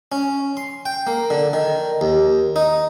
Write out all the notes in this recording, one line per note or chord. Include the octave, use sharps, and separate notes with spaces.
C#4
C6
G5
A#3
D3
D#3
D#2
D#4